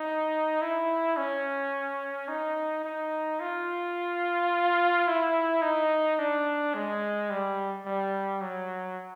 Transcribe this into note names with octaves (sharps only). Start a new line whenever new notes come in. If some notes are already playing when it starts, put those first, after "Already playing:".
Already playing: D#4
E4
C#4
D#4
D#4
F4
E4
D#4
D4
G#3
G3
G3
F#3